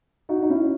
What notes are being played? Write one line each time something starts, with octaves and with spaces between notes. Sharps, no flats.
D#4 F#4
D#4
C#4 E4